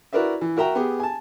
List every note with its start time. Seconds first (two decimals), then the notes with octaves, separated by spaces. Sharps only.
0.13 E4 F#4 A#4 B4 D5 E5
0.41 E3
0.57 F#4 A#4 E5 G5 A#5
0.75 B3 G4 G#4
0.99 G#5 A5